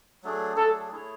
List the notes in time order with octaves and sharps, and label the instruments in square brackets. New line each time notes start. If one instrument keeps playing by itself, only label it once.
[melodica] F#3 A3 D4 G#4
[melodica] F#3 A3 D4 G#4 [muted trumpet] A4
[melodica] A3 E4 G#4 C#5